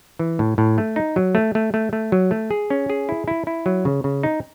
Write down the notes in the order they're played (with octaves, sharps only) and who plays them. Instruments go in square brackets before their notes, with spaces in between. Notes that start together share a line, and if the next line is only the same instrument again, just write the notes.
[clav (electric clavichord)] E3
A2
A2
A3
D#4
F#3
A3
A3
A3
A3
F#3
A3
G#4
C#4
G#4
E4
E4
E4
F#3
C#3
C#3
D#4